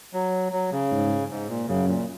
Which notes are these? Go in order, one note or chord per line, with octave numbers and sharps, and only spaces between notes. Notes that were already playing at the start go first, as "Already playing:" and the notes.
F#3
F#3
C#3
G#2
G#2
A#2
F#2 C#3
A#2